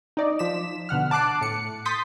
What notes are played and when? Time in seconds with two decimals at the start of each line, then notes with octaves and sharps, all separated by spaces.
0.17 D#4 D5 D#5
0.39 F3 B6 E7
0.89 B2 D3 F#5 F6
1.11 A5 D6 F#6 C7 D7
1.41 A2 C#7
1.85 C6 D#6 G6 A6 B6